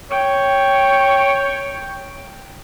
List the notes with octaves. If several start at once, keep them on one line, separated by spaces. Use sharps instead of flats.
C#5 G5